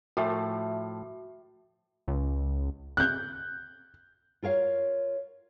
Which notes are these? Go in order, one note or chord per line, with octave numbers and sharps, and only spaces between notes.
A2 F3 A3 F#4 E5
C#2
F#6 G6
F4 A#4 C#5 F5